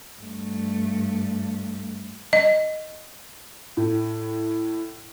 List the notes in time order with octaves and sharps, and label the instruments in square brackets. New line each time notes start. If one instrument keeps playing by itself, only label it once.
[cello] G2 A3
[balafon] D#5
[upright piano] A2